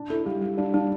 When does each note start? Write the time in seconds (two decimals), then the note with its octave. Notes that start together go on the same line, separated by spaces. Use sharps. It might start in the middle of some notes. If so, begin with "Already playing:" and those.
Already playing: D4
0.10 E4 A4
0.25 G3 G4
0.42 G3
0.57 G3 D4
0.74 G3 D4